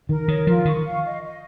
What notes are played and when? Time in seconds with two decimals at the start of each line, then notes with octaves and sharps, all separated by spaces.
0.09 D#3 A#4
0.28 D#3 C#5
0.47 F3 F4
0.65 D#3 C#6
0.84 F5
1.04 D#5
1.23 D#5